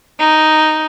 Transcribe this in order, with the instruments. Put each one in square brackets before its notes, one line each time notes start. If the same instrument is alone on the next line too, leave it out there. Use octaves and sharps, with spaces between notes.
[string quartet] D#4